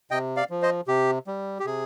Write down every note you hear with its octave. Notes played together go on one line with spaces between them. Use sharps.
C3 D#5 G5
D5 F5
F3
C5 D#5
C3 G4
G3
G4
C3 G#4